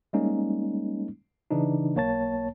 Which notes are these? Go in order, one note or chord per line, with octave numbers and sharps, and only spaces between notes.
G3 G#3 A#3 C#4 D#4
C#3 E3 D4 D#4
B1 A#3 C#5 A5 A6